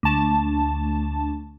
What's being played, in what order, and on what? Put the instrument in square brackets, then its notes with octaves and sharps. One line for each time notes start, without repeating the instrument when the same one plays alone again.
[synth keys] D2 A5